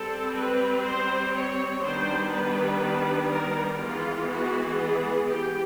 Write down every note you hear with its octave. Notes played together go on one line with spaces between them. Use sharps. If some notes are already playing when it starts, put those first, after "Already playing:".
Already playing: G3 C4 A4
B4
C5
C#5
D#3 G3 B3 D4 C5
B4
A#4
E3 G#3 B3 F4
F#4
G#4
G4